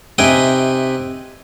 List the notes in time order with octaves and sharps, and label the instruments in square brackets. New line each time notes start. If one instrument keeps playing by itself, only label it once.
[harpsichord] C3 D#4 B4 E5 G5 G#5